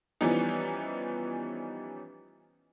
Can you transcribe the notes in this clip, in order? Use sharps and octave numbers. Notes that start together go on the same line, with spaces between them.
E3 F3 G3 B3 C#4 D#4